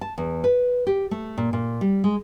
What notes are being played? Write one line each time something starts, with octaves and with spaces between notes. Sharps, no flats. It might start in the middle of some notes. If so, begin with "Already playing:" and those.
A5
E2
B4
G4
A3
A#2
A#2
G3
G#3